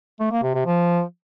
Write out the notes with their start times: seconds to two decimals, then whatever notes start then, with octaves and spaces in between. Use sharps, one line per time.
0.20 A3
0.31 A#3
0.43 C3
0.55 C3
0.66 F3